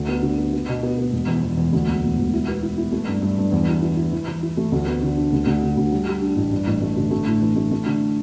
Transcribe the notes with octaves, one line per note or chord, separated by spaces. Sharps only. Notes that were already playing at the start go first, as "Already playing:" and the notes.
Already playing: D2
B3
D3
B3
B3
B2
B3
B3
E1
E2
E2
E2
D2
E1
E1
E1
E4
B3
E4
E4
A3
G2
G2
G2
E2
E4
E4
E4
E3
E3
E4
A3
D2
B3
D3
D4
D2
D2
D3
D2
G3
G3
D4
A1
G2
A1
A3
D3
A3
A2
E3
A3
A3
D3